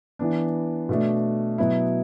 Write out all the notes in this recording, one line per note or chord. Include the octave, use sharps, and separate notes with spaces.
E3 B3 D4
B2 A3 D4
B2 F#3 B3 E4